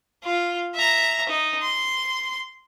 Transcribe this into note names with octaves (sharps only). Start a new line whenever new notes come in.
F4
E5 A#5
D#4
C6